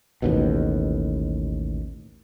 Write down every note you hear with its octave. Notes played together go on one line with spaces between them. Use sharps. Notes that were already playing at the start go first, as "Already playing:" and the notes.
A1 D#2 B2